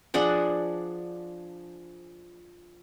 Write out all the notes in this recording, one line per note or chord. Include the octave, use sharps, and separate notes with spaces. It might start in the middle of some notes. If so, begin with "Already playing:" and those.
F3 D4 G#4 F#5